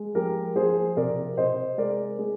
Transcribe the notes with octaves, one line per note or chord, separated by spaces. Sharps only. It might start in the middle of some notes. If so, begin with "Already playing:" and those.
Already playing: G#3
F3 G4 A#4
F3 G#4 C5
C3 A#4 D5
C3 C5 D#5
G#3 A#4 D5
G#3